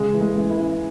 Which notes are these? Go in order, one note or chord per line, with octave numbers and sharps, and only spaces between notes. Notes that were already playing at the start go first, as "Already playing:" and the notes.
Already playing: C#3 G#3 G#4
E3
G#3 G#4
E3
E4
E3